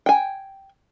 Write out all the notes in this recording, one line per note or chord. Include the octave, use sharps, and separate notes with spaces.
G5 G#5